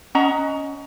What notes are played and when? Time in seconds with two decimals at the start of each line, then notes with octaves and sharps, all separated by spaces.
0.15 C#4 D#5 F#5 A#5